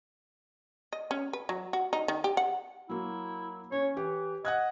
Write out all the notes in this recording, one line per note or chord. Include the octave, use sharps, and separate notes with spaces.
D#5
C#4
B4
F#3
F#4
D#4
D#3
G4
F#5
F#3 A#3 E4
C#4 C#5
E3 G4
D#5 F#5 F#6 G#6